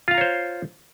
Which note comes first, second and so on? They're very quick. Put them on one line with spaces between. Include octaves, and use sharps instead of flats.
F4 F5 A#5 C#5 C5